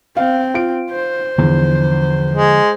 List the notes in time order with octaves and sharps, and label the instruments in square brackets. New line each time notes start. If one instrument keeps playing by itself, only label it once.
[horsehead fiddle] C4 [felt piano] F5
[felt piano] F4 D7
[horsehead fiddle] C5
[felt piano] E2 [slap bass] D3 F3
[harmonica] G#3